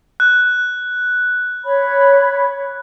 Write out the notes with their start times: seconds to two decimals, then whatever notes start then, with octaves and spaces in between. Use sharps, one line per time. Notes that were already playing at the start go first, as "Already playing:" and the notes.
0.20 F#6
1.65 C#5 B5